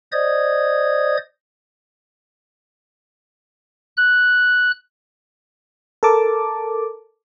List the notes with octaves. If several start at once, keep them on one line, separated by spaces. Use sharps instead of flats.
C5 D5 D#5 D#6 G#6
F#6
A4 A#4 A5 D6